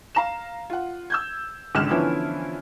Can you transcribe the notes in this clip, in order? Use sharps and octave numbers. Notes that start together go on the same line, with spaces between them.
F5 A#5 E7
F4 F#5
E6 G6 G#6
G#1 C#2 D3 F6 F#6 E7
D3 E3 F3 B3 C#4 E4